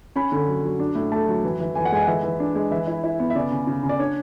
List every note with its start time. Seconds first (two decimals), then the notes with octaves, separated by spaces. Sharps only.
0.16 C#4 B5
0.32 D3
0.48 F#3
0.63 F#3
0.80 D4
0.95 A2
1.11 A3 A5
1.28 F#3
1.44 E3
1.60 E3
1.75 E3 G#5
1.85 F#5
1.92 G#3 G#5
2.02 F#5
2.08 E3 E5
2.23 E3
2.40 D4
2.55 G#3
2.71 E3 E5
2.87 E4
3.03 E4
3.20 B3
3.30 E5
3.35 C#3 D5
3.51 C#3
3.67 C#3
3.83 C#3
3.89 D5
3.99 D4 C#5